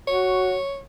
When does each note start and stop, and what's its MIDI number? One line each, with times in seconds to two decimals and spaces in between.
0.08 0.55 66
0.08 0.80 73